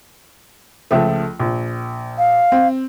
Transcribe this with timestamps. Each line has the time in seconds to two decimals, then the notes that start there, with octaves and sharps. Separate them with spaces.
0.91 C#2 F3 A3
1.39 A#1
2.18 F5
2.52 C4